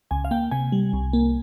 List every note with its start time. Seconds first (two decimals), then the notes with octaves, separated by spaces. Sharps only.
0.11 C#2 G#5
0.25 F5
0.31 A#3 G5
0.51 C3 G#5
0.72 G3
0.93 C2
1.13 A#3